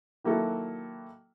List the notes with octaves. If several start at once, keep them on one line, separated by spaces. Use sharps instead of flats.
D#3 F#3 A#3 E4 F#4 A4